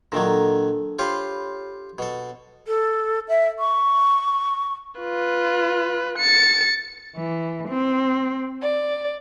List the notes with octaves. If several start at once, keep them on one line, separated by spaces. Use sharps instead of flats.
A#2 D#3 F#3 D4 A4 A#6
F4 G4 C#5 F5 B5 C6
B2 A4
A4
E5
C#6
F4 B4
A6 C#7
E3
C4
D5